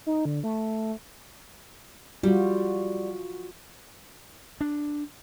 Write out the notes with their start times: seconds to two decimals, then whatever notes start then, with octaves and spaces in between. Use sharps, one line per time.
0.06 D#4
0.25 D3
0.44 A3
2.23 G3 F4 F#4
4.61 D4